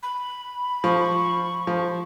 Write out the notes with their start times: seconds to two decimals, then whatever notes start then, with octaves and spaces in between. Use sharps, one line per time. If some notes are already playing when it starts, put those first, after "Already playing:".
0.03 B5
0.84 F3 C#6
1.67 F3